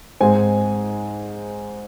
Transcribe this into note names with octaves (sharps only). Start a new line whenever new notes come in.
G#2 G#3 C4 G#5